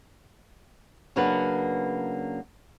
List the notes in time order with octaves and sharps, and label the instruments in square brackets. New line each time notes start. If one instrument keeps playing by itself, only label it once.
[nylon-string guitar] C#3 F#3 A#3 B3 D4 B4